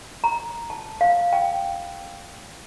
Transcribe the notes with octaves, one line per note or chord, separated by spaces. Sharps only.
A#5
A5
F5
G5